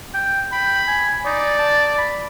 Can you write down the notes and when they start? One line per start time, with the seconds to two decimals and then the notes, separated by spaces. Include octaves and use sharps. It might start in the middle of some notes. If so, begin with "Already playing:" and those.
0.14 G5
0.52 G5 B5
0.87 G#5
1.25 D#4 D5
1.59 A5
1.98 B5